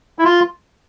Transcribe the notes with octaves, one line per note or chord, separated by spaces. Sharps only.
E4
F4